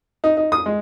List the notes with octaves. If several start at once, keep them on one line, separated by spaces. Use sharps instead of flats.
D#4
D#4
D#6
G#3